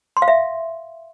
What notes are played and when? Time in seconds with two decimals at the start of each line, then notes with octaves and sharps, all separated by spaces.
0.17 C6
0.22 F5
0.28 E5